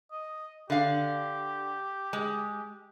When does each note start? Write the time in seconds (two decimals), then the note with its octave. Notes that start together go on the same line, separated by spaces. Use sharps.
0.12 D#5
0.70 D3 G4 F5
2.13 G#3